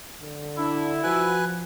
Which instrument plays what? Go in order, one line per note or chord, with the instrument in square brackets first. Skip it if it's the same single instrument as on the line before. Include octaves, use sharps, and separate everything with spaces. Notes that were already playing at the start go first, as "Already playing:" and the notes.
[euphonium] D3
[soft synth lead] D4 [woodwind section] E4
[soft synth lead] F3 [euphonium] F#4 [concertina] B4 G#5 F#6